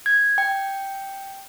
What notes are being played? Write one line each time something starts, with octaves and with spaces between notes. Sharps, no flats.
G#6
G5